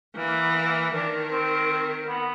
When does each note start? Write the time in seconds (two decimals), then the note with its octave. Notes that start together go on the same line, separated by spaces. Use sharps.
0.16 E3 A#3
0.28 A#3
0.42 B3
0.54 A#3
0.93 D#3 D4
1.31 C4
2.07 B3